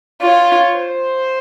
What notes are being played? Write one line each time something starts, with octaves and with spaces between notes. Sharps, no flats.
F4 C#5
C5